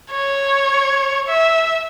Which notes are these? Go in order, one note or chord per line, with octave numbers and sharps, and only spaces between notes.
C#5
E5